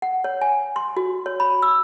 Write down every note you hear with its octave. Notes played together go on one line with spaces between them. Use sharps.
F#5
C#5
G#5
C6
F#4
C#5
B5
E6